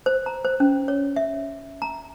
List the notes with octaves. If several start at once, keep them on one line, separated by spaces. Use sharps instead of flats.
C5
A#5
C5
C#4
C#5
E5
A#5